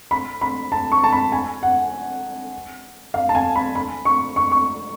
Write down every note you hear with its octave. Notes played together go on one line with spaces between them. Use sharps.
B5
B5
A5
C#6
A5
B5
G#5
F#5
F5
A5
G#5
B5
B5
C#6
C#6
C#6